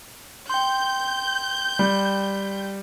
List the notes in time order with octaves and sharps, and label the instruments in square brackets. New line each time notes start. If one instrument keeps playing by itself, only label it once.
[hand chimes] G5 C6 [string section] G6
[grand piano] G3